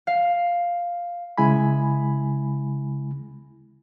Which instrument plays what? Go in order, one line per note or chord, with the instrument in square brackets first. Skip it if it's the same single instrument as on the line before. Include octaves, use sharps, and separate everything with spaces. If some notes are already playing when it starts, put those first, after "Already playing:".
[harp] F5
[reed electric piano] C#3 G#3 E4 G#5 B5